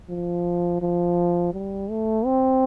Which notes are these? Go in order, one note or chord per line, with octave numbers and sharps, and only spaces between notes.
F3
F3
G3
A3
C4